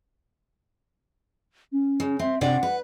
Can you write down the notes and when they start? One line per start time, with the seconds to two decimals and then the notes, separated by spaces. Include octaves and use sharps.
1.72 C#4
2.00 C#3
2.19 C4 E5
2.41 C3 D4 D5 F#5
2.63 B4